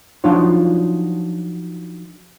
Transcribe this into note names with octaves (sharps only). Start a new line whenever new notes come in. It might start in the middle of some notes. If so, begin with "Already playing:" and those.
F3 F#3 D4 D#4 F4 C#5